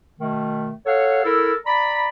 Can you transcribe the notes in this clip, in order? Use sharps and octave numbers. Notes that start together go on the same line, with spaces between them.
B2 D#3 A3
A4 C#5 F5 F#5
E4 A4 A#4 E6
D5 A#5 B5